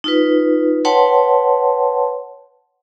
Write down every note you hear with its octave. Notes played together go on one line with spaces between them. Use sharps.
D#4 F4 B4
B4 C#5 F#5 G5 A5 C6